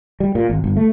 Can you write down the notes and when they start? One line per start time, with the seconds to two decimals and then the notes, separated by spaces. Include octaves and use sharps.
0.20 G3
0.35 A#2
0.50 G#1
0.64 G1
0.77 A3